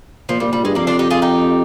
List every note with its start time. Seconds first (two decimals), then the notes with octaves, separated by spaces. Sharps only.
0.29 A#2 F3
0.40 A#2 G3
0.53 A#2 G3
0.64 G2 G#3
0.75 F2 G3 A#3
0.87 D4 F4
0.99 D#4 G4
1.10 F4 G#4
1.22 D#4 G4